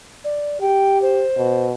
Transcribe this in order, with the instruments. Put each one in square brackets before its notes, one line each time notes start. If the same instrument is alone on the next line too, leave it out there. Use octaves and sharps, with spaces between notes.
[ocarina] D5
[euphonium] G4 [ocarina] G5
[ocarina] C5
[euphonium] B2